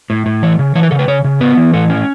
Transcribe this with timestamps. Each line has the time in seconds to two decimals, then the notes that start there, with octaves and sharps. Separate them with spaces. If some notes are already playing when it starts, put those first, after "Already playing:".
0.10 A2
0.26 A2
0.42 E3 C#5
0.59 C#3
0.75 E3 C#5
0.83 B4
0.91 C#3 A4
0.99 B4
1.08 C#3 C#5
1.24 C#3
1.41 B3 B4
1.57 E3
1.74 A2 A4
1.90 C#4